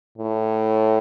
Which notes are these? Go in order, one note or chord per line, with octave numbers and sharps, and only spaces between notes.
A2